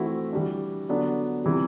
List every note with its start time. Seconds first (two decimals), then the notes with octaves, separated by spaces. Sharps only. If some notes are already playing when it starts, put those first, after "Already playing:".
Already playing: E3 A3 C4 E4 F#4
0.32 E3 G3 D4
0.89 D3 F#3 B3 D4
1.44 C3 E3 G3